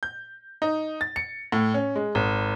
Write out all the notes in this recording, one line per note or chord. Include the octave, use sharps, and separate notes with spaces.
G6
D#4
A6
C#7
A2
C#4
G#3
G#1